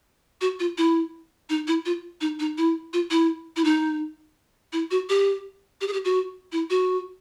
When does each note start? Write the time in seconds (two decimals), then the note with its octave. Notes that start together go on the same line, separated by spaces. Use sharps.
0.41 F#4
0.60 F4
0.78 E4
1.49 D#4
1.67 E4
1.85 F4
2.21 D#4
2.39 D#4
2.58 E4
2.93 F4
3.10 E4
3.56 E4
3.64 D#4
4.73 E4
4.91 F#4
5.09 G4
5.81 G4
5.88 G#4
5.93 G4
6.04 F#4
6.52 E4
6.70 F#4